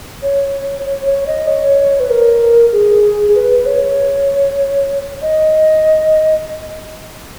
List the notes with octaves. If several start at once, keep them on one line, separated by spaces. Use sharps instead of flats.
C#5
C#5
C#5
D#5
C#5
B4
A#4
G#4
B4
B4
C#5
D#5